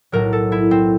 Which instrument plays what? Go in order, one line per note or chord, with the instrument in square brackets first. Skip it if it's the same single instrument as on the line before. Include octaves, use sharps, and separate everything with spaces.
[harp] B1 A2 F#3 A#4
A4
E4
C4